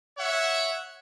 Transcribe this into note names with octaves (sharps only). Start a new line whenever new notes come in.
C#5 E5 F#5